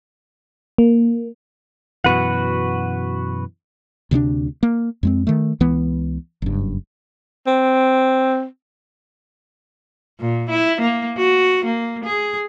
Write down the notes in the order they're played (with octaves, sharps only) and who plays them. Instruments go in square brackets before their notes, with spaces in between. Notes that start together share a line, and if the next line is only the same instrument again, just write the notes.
[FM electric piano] A#3
[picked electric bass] F#2 B2 E3 [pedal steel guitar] F#4 B4 F#5
[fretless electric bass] D2 C3 G3 D4
A#3
F2 G#3 C4
D#3 A3
C#2 E3 B3
F#1 G2
[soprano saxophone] C4
[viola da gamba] A#2
E4
A#3
F#4
A#3
G#4